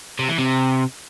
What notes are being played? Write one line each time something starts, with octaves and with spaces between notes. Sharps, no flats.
C3
E3
C3